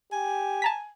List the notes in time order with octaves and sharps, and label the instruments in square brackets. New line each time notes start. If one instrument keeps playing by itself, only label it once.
[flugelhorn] G4 [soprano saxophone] G#5
[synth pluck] A5 A#5 B6